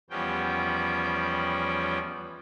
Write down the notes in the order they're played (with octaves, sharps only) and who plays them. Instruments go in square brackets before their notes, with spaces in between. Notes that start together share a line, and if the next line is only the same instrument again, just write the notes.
[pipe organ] E2 F3 G3 B3 C#4 G5